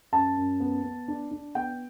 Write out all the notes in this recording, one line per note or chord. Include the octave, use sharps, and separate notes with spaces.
F#2 A5
F#2
B3
B3
D4
D4
B3 G5